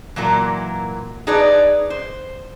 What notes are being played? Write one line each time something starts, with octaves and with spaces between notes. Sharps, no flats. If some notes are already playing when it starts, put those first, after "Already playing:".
A#2 E3 F#3 A#4
D#4 G#4 B4 D5
C5